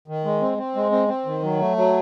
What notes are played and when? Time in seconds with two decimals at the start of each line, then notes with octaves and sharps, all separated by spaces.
0.08 D#3
0.25 G#3
0.41 C4
0.58 C4
0.75 G#3
0.92 C4
1.08 C4
1.26 D#3
1.43 F#3
1.60 A3
1.77 F#3